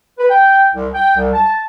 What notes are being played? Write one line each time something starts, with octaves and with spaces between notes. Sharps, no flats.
B4
G5
C2
G5
C2
A5